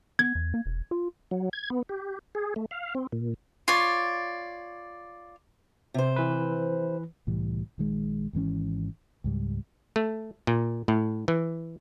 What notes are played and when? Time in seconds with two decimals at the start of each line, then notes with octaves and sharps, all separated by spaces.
0.19 B3 G#6
0.35 E2
0.54 A#3
0.66 E1
0.91 F4
1.31 F#3
1.53 G#6
1.70 B3
1.89 G4
2.35 G#4
2.56 A3
2.71 F5
2.95 C4
3.12 A#2
3.68 F4 C#5 D5
5.94 C3 C5
6.16 E3 B4
7.27 C2 A2 E3 G3
7.78 A#1 D#3 G#3
8.33 G#1 G#2 E3 C#4
9.24 C#2 G#2 F#3 G3
9.96 A3
10.47 A#2
10.88 A2
11.28 E3